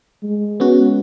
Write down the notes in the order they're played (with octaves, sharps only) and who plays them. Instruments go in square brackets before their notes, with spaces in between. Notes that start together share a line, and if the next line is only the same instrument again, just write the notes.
[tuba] G#3
[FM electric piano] B3 C#4 F#4